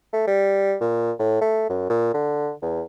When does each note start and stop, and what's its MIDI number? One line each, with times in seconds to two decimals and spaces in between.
0.13 0.24 57
0.27 0.76 55
0.81 1.12 46
1.19 1.41 45
1.41 1.66 57
1.70 1.86 42
1.90 2.13 46
2.14 2.52 50
2.62 2.83 40